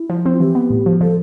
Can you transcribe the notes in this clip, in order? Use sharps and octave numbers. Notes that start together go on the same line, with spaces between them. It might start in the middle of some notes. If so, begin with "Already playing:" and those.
Already playing: E4
F3
C4
F4
E3 G4
B3
A2
F3
F3 A4